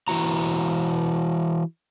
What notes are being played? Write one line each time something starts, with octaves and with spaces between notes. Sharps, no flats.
E3 E4 F#4 A#5